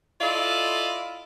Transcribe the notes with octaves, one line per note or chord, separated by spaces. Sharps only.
E4 F4 A4 D5 D#5 F5